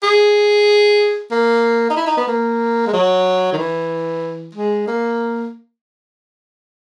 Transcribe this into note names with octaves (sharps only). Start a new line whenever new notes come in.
G#4
A#3
D#4
E4
D#4
B3
A#3
G#3
F#3
D#3
E3
G#3
A#3